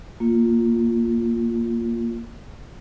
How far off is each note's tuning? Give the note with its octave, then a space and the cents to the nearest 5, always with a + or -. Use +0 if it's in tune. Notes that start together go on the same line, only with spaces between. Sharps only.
A#3 +0 F4 +0